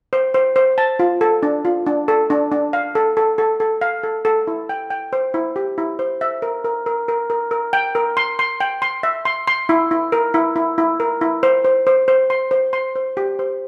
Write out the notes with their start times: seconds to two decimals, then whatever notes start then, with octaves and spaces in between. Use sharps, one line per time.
0.13 C5
0.34 C5
0.56 C5
0.78 A5
0.99 F4
1.21 A4
1.43 D4
1.65 F4
1.86 D4
2.08 A4
2.30 D4
2.52 D4
2.73 F5
2.95 A4
3.17 A4
3.38 A4
3.60 A4
3.81 F5
4.03 A4
4.25 A4
4.47 E4
4.69 G5
4.90 G5
5.13 C5
5.34 E4
5.56 G4
5.78 E4
5.99 C5
6.21 E5
6.42 A#4
6.64 A#4
6.86 A#4
7.08 A#4
7.30 A#4
7.51 A#4
7.73 G5
7.95 A#4
8.17 C6
8.39 C6
8.60 G5
8.82 C6
9.03 E5
9.25 C6
9.47 C6
9.69 E4
9.91 E4
10.12 A#4
10.34 E4
10.56 E4
10.78 E4
11.00 A#4
11.21 E4
11.43 C5
11.65 C5
11.87 C5
12.08 C5
12.30 C6
12.51 C5
12.73 C6
12.96 C5
13.17 G4
13.39 C5